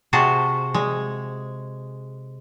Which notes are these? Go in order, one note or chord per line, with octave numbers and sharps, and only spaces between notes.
C3 F#4 G#4 C5 A5
G#3